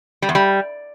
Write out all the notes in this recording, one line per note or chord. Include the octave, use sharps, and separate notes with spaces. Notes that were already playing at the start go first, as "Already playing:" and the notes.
G3
E2
G3